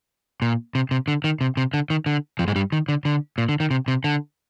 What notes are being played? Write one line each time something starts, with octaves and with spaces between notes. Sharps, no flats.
A#2
C3
C3
D3
D#3
C3
C3
D3
D#3
D3
F2 F3
G#2 G#3
G2 G3
D#3
D3
D3
A#2
D3
D#3
C3
C3
D3